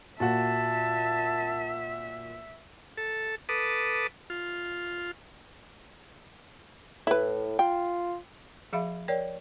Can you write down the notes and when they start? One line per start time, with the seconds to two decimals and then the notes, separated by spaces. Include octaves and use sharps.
0.20 A#2 F#4 E5 A5
2.97 A4
3.49 A4 B4 D6 D#6
4.30 F4
7.07 A2 E4 B4
7.59 F4 G5
8.73 F3 G#4 E5 F5 B5
9.08 A#4 C#5 D5 G5